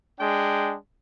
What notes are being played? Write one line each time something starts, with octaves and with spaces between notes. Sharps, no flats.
G#3 D4 G5